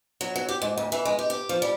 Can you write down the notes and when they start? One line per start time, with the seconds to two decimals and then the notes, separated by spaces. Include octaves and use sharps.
0.21 F#3
0.36 F#3
0.49 G4
0.62 G#2
0.78 D2
0.92 E3
1.05 G#3
1.19 G4
1.30 G4
1.49 F3
1.62 G3